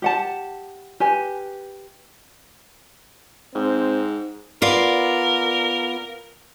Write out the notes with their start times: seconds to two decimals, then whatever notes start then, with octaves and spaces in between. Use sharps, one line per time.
0.02 G4 F#5 A5
1.00 G4 B4 G#5
3.55 G#2 C4
4.62 B3 F4 A#4 D5